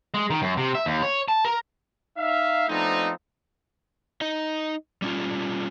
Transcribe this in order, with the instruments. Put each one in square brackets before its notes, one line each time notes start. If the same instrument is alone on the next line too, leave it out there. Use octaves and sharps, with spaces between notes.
[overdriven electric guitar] G#3
D#3
F#2
C3
E5
D#2
C#5
A5
A#4
[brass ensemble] D#4 E5 F5
F3 A3 B3 C4 D4 D#4
[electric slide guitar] D#4 D#5
G3 C#4 F4